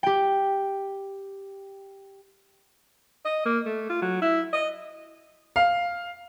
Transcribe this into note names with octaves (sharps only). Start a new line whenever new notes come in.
G4 G5
D#5
A#3
A3
F4
F#3
E4
D#5
F5